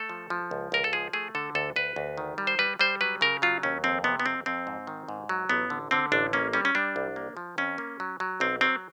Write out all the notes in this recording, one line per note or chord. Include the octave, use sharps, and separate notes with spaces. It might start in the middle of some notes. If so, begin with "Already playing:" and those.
Already playing: A3 A4
F3
F3
C#2
C#2 A#4
A4
F3 G#4
A3 G#4
D3 A4
D2 A4
D2 B4
D2
D#3
G3
C5
G3 B4
G3 C5
F#3 B4
C#3 A#4
F#3 F4
D#2 C#4
F2 C4
C3 B3
B3
F2 C4
F2 C4
G#2
D#3
G#2
F#3
A1 B3
D3
D3 C4
A1 D4
A#3 C#4
G3 C#4
C#4
G3 D4
C2
A#3
F3
F2 C#4
A#3
F#3
F#3
B1 C4
F#3 C4